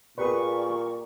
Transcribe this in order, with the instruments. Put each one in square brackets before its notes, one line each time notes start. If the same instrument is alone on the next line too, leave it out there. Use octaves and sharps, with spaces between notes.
[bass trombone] A#2 [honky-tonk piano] G4 A#4 D5 [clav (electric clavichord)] G#4 B4 [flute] C#6